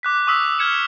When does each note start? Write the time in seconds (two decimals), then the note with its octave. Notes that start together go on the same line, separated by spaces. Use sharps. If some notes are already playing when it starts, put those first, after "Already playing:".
0.03 D6 F#6 B6
0.27 C#6 D#6 E6 B6 F7
0.59 F6 G#6 C#7 E7